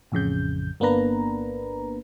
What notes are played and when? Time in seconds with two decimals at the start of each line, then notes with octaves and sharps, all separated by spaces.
0.12 A1 F2 C#3 G6
0.80 G1 A#3 B3 D4 B4 A#5